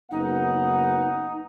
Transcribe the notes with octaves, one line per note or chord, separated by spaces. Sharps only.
F#1 B3 D#4 F#5